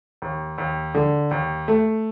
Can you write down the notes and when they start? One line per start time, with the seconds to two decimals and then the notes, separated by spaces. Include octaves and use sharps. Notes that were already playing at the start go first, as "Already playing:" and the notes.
0.22 D#2
0.58 D#2
0.94 D3
1.31 D#2
1.68 A3